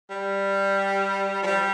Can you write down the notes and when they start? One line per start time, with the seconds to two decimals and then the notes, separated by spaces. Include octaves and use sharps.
0.10 G3
1.43 F3
1.47 G3